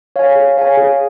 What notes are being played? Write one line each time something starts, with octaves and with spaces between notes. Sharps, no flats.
C#5 F5 G#5
G#4
C#5 F5 G#5
G#4